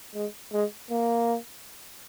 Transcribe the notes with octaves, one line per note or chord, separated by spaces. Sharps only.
G#3
G#3
A#3